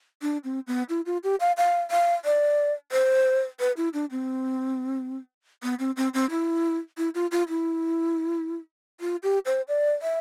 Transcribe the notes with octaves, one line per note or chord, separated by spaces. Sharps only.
D4
C4
B3
E4
F4
G4
F5
F5
F5
D5
C5
B4
E4
D4
C4
B3
C4
C4
C4
E4
E4
F4
F4
E4
F4
G4
C5
D5
E5